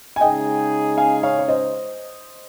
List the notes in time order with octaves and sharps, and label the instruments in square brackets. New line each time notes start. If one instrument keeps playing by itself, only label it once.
[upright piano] G#5
[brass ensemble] C#3 G#3 D#4 G#4 [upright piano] D#5 G5
[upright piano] F5 G#5
C#5 F5
C#5
C5 D#5